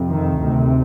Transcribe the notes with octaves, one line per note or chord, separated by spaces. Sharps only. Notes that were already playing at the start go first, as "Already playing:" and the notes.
Already playing: F2 C3
D#3
D2 C3